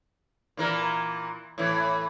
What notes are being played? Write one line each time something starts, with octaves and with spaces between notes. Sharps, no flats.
A#2 E3 A#4
A2 E3